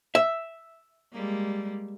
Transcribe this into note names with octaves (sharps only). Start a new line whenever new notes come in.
E5
G3 G#3 A#3